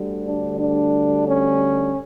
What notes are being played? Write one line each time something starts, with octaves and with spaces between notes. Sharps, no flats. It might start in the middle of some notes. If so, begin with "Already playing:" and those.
Already playing: D2 D3 G3
D4
D4
C#4